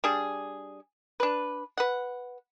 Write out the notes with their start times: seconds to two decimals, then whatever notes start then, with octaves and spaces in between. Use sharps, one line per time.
0.04 G3 D4 G#4
1.20 D4 B4
1.77 B4 F#5